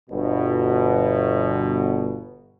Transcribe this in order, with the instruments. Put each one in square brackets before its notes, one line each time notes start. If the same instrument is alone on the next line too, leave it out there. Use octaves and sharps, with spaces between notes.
[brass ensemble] G1 B2